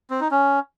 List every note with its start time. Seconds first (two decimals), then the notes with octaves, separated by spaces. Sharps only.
0.10 C4
0.21 D#4
0.31 C#4